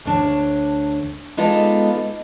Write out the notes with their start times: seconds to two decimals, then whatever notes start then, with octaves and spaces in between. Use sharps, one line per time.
0.05 D2 D4 C#5
1.37 G#3 B3 D#4 F4 A4 D5